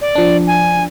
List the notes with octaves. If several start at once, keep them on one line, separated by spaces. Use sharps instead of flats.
D5
F3 D4
G#5